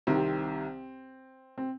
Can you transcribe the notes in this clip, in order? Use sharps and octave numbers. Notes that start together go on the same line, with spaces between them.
C2 C3 D#3 C4
C4